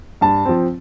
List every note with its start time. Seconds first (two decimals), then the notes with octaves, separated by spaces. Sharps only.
0.21 G2 A5
0.45 F3 C4